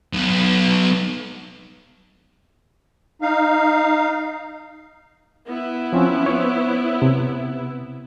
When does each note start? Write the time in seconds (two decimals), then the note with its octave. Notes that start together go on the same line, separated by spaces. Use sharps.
0.13 B1
3.22 D#4 F5
5.48 B3 E4
5.93 F3 C4 C#4
6.26 C5 C#5
7.02 C3